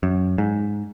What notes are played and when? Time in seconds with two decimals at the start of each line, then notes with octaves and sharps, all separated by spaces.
0.03 F#2
0.38 G#2